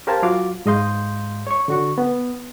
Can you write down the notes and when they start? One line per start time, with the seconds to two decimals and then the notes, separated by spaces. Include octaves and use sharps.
0.07 G4 A#4 C5 F5 G#5 A5
0.23 F#3 F4 F#4 F5 D6
0.66 G#2 G#3 D#5 F5 C6 G6
1.47 C#5 C#6
1.68 D3 F#4 C#6
1.98 B3